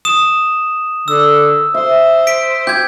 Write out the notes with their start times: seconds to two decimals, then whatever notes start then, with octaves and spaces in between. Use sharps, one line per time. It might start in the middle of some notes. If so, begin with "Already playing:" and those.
0.05 D#6 E7
1.08 D3 E6
1.74 C5 E5
2.27 B6 D7
2.67 G4 G6 G#6